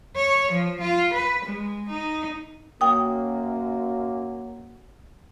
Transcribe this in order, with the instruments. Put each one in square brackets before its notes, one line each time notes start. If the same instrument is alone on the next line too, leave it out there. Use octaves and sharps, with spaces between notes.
[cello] C#5
F3
F4
B4
G#3
D#4
[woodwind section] F#2 A#3 [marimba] G5 D#6